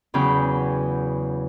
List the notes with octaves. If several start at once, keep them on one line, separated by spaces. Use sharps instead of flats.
E2 C#3 F#3 G5 B5